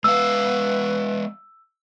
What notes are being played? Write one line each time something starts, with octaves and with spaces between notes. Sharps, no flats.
G#3 B3 B4 F5 E6